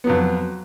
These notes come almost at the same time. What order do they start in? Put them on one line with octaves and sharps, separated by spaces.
B3 F#3 F2